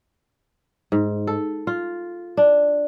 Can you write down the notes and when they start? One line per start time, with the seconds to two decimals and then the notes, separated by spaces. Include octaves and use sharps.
0.92 G#2
1.27 A4
1.67 F4
2.37 D4